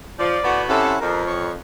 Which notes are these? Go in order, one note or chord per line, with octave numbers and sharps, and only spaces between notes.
F3 D5
A2 B3 F#4
C3 C#4 E4 A4 F#5
F2 A#4
C#5 C#6